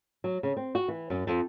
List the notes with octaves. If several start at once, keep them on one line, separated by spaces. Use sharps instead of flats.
F#3
C#3
C4
F#4
E3
F#2
F2